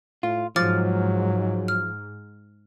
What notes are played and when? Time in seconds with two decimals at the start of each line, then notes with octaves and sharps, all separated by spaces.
0.23 A2 F4
0.56 G#2 F3 F#3 D6 F6 A6
1.68 F6